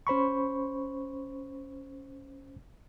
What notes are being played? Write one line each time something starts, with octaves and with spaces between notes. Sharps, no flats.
C#4 C5 B5 C#6